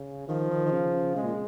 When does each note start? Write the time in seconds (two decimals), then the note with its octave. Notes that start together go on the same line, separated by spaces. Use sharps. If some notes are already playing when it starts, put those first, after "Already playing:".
Already playing: C#3
0.28 D#3 F3
0.50 D#3
0.65 D#3
0.71 C#3
1.15 C#3 G#3
1.23 A#2